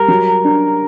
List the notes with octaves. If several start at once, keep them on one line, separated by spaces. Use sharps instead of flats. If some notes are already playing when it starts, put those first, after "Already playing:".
Already playing: G3 A#4
F#3
D4